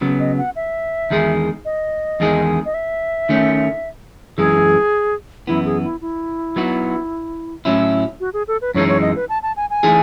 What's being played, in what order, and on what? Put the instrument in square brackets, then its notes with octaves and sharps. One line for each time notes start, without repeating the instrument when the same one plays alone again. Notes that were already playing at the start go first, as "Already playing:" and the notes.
[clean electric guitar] C#3 F#3 B3
[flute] D#5
F#5
E5
[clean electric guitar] E2 D#3 G#3 D#4 G#4
[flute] D#5
[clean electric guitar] E2 D#3 G#3 D#4 G#4
[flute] D#5
E5
[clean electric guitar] D#3 A3 C#4
[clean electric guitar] F#2 E3 G#3 [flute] G#4
[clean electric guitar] F#2 E3 B3 [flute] E4
[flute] G#4
E4
E4
[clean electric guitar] F#3 B3 D#4 F#4
A2 F#3 C#4 E4
[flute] F#4
G#4
A4
B4
[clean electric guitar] F#2 E3 G#3 D#4 [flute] C#5
[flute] C#5
D#5
B4
A5
A5
G#5
G#5
[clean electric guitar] E3 A3 D#4 G#4